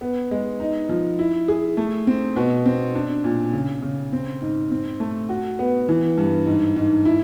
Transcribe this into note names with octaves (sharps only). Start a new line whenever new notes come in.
B3
G#3
D#4
F3
E4
G#4
A3
C4
B2
C4
D4
A#2
C#3
C#3
C4
G#2
C4
A3
F#4
B3
E3
G2
G#2
G#2
E4